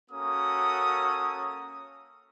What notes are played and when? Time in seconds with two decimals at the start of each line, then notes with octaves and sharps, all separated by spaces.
0.11 A#3 C#4 F#4 A4 A#5 D#6